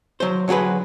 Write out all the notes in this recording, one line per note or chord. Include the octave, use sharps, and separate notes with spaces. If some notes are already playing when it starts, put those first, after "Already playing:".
F#3 C5
D3 F#3 F#4 G#4 B4